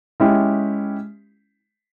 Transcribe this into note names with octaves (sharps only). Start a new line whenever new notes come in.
G#3 C#4 E4 G4